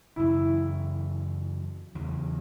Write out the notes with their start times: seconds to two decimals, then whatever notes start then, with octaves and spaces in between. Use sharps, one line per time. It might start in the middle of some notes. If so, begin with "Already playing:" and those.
0.16 F#2 C#3 E3 E4
1.95 E2 C#3 F#3